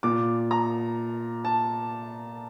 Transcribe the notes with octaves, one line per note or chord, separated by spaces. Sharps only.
A#2 D6
A#5
A5